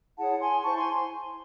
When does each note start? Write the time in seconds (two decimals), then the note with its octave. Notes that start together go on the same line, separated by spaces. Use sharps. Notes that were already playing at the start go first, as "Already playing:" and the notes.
0.17 E4 G#4 C#5 F#5 A5
0.40 G#5 C6
0.63 E4 C5 A5 C#6
0.78 G#5 C6